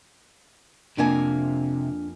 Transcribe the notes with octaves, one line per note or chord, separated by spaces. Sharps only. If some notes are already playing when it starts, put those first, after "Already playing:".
F2 C3 A#3 D4 G#5